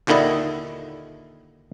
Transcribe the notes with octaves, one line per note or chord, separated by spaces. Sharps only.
D#2 A#2 D3 D#3 E4 D#5